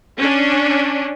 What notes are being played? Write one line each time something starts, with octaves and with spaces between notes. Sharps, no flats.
C#4 D4